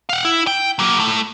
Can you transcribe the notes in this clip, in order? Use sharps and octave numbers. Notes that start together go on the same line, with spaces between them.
F5 F#5
E4
G5
F#3 A#3
A2 A3